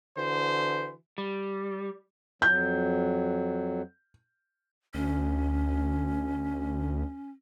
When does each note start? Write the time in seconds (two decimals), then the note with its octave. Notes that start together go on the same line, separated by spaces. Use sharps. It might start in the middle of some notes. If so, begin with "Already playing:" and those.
0.16 D3 E3 F#4 C5
1.18 G3
2.42 F2 F#3 G6
4.94 D2 C#4